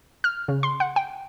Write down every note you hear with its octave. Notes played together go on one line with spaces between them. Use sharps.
F6
C#3
C6
F#5
G5